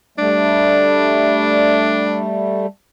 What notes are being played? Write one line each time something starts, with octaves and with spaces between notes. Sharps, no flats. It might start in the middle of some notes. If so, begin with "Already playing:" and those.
G3 A3 D4